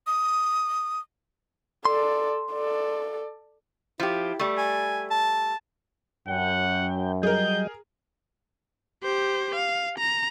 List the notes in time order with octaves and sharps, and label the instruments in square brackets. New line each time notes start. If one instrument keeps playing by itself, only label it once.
[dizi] D#6
[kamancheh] A4 D5 [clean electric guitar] C6
[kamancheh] A4 D5
[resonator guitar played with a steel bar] F3 G4 [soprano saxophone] E4
[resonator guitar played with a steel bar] G3 A3
[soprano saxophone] G#5
A5
[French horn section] F#2 [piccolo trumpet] F#5 [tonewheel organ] G5
[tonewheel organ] F#3 G3 D#5 [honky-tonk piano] G#4 A#4 [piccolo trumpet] G6
[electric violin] G4 C5
F5
A#5